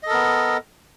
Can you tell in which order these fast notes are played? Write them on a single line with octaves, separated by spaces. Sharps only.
D#5 A4 A#4 B3